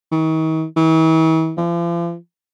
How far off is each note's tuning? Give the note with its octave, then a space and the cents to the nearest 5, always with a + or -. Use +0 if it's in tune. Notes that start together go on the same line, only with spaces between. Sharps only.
D#3 +40
E3 -40
F3 -40